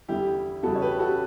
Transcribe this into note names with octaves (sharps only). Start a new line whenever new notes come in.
E2 D3 G3 E4 G4
E2 C#3 G3 F#4 A4
C#5
G4 B4
F#4 A4